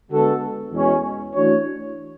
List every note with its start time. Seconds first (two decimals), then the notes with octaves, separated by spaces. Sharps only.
0.11 D3 G#3 B3 F#4 A4
0.72 E2 B2 G#3 C#4
1.35 E3 A3 D4 F#4 C#5